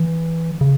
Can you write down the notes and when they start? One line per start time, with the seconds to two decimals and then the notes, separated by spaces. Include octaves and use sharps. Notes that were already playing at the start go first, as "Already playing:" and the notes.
Already playing: E3
0.61 C#3